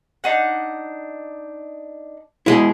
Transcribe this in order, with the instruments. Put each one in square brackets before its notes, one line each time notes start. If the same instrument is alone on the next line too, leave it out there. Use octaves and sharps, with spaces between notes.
[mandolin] D4 D#4 F#5
[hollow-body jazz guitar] B2 G#3 E4